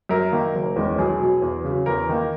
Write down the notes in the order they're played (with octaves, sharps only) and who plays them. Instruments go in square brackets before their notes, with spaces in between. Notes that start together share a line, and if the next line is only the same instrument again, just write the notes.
[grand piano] F#2 A#4
D#3 A#3
F#1
E2 D#3 G#3 C#4
B1 G#4
B2 F#3
E2
C#3 F#3
E2 A#4
D#3 A#3